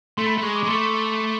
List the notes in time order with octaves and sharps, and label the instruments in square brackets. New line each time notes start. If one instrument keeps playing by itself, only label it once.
[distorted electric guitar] A3 [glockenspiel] C6
[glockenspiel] B5
C6
[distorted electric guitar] A3
[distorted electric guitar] G#3 [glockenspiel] C#6
[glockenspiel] D6
[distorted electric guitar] G#3
[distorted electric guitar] A3 [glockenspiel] C6
[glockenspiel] C#6
C6